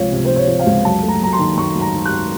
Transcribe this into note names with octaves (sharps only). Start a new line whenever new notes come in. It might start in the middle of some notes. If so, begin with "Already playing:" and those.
Already playing: C#2 C3 F3 C#5 F5
C3
F3 C5
C#5
F3
F5
C#2
F#2 A5
A3
A#5
F#2 A#5
C6
D#3
F#2 C#6
F#2
A#5
D#3
F#6
F#2